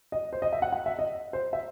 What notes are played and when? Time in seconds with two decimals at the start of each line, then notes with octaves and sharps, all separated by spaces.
0.12 D#5
0.33 C5
0.42 D#5
0.53 E5
0.62 F#5
0.72 F#5
0.86 E5
0.99 D#5
1.33 C5
1.53 E5